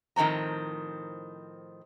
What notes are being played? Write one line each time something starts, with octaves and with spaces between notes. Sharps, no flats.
A2 D#3 F3 C4 A#5